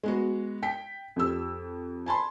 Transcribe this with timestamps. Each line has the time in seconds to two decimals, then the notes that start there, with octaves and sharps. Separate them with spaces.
0.03 G#3 B3 F#4
0.63 G5 B6
1.16 F2 G4 E6
2.06 G#5 A5 B5 C6